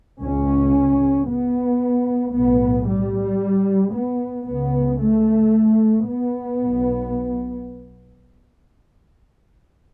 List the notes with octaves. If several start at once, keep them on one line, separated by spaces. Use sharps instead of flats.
C#2 C#3 C#4
B3
B1 A2 B3
G3
B3
C#2 C#3 B3
A3
B3
B1 B2